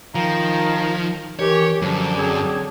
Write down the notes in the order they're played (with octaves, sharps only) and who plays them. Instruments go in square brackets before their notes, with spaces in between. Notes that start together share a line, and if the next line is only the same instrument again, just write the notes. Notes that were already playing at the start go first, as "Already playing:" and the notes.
[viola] D#3 [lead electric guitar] F3 [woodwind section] F5 G5 A#5
[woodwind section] D#3 E3 [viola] G4 [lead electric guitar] C#5
[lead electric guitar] F#2 [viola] D3 [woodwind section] F3
[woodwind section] F#3 C4 G#4